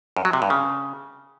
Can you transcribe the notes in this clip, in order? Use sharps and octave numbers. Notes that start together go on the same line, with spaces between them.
F#2
F#3
C3
G2
C#3